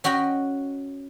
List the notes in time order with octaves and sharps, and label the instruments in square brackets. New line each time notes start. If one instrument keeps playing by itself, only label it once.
[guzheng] C#4 F#4 D#5 G5 B5